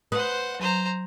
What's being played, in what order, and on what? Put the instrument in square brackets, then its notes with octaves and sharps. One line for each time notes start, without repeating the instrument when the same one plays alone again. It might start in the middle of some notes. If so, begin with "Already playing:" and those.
[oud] B4 [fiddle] C5 F#5 [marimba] D#6
[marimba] F#3 [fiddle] C5 A#5